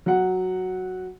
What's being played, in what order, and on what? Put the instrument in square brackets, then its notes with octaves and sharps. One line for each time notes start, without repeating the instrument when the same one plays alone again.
[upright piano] F#3 F#5